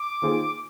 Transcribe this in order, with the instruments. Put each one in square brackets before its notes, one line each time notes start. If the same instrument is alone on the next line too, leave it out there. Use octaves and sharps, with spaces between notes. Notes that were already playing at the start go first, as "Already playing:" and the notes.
Already playing: [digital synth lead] D6
[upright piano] D#3 A#3 F4 G#4 C5